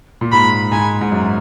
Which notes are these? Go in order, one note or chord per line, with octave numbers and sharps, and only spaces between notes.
A#2
G#2 B5
G#2 G#5
G#2
F#2